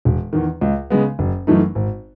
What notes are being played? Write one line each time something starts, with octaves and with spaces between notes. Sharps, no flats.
E1
E2 D#3
C#2
C#3 G#3 B3
F#1
F#2 E3 A3 D#4
G#1